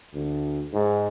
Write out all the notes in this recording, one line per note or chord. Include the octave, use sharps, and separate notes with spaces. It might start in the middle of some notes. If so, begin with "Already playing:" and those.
D2
G#2